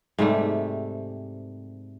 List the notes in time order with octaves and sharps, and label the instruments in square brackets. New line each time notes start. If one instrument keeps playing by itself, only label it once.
[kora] G#2 C3 G3 A3